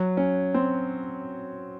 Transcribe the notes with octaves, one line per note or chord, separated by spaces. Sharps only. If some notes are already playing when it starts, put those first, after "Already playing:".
Already playing: F#3
C#4
C4